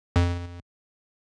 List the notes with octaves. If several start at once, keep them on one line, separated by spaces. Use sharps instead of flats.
F2